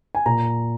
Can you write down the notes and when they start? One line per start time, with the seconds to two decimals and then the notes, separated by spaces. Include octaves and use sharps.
0.15 G#5
0.26 A#2 A#5